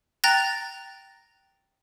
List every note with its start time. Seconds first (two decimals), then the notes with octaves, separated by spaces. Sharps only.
0.24 G5 A#5 F#6 A6 A#6